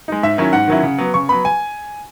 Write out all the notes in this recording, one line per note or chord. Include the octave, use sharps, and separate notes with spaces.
G#3 D#4
G#2 E5
D#3 F#3 C#4 E4
G#2 F#5
D#3 F#3 C#4 E4
C#3
F#3 B3
C#3 C#6
F#3 B3 B5
G#5